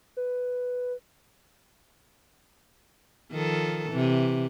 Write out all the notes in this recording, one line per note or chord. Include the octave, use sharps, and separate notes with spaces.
B4
D#3 F3 A4
C3 E3